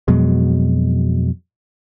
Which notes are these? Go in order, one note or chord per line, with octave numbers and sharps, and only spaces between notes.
F2 B2 F#3 G#3